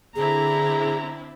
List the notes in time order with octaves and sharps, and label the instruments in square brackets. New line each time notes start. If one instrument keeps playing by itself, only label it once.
[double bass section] D3 [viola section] C4 D4 E4 [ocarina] G#4 [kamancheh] A#5